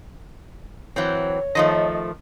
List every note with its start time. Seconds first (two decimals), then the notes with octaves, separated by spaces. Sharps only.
0.96 E3 F#3 C4 C#5
1.55 D#3 F3 A3 D#5